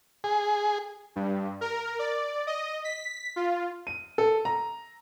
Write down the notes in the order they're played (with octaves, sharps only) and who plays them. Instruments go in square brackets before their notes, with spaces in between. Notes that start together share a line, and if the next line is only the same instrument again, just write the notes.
[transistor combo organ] G#4
[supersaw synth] G2
A#4
D5
D#5
B6
F4
[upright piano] D#7
A4
A#5